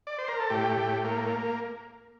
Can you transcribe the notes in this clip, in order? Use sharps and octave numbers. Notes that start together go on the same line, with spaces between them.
D5
C5
A#4
A4
A2 G4
A2
A#3